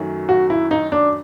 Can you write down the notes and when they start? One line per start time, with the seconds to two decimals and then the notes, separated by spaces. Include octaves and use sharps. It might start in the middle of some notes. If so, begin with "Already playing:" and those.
Already playing: F#2 D#3 F#3 A3 C#4
0.29 F#4
0.50 E4
0.71 D#4
0.92 D4